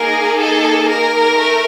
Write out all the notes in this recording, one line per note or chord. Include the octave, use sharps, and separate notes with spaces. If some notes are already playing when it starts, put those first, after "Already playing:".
Already playing: A#3 D#4 G#4 A#4
A4
A#4
A3